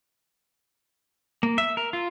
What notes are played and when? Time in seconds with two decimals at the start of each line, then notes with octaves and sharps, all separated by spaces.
1.43 A#3
1.58 E5
1.77 A#4
1.93 F4